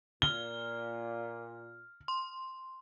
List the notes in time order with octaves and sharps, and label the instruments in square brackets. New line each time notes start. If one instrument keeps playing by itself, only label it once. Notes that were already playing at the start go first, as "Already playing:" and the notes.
[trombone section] A#2 [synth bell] F6 [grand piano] G7
[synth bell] C6